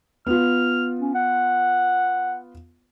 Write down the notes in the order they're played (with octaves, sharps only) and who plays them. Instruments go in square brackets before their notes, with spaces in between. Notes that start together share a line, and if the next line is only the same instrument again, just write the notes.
[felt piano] B3 F4 [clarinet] F6
[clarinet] C#4
F#5